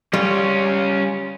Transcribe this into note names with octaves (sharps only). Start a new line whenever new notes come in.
G3 C#4 F4